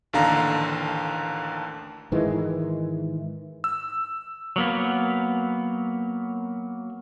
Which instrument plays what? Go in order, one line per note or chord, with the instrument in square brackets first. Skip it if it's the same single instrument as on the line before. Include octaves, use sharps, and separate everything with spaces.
[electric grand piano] A1 D#2 D3 F5 A#5
[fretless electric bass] G#2 D#3 E3 G#3
[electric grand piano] E6
[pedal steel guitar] F#3 A#3 B3